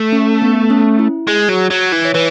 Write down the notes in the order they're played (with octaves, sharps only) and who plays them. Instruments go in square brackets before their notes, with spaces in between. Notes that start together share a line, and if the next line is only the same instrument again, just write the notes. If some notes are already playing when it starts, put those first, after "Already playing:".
Already playing: [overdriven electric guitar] A3
[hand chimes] C#4
B3
C#4
E4
[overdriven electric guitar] G#3 [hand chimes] G#4
[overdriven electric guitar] F#3
F#3
E3
[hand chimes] C#5
[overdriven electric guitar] E3 [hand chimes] B4